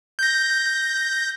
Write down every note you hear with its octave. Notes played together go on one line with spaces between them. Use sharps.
G6 A#6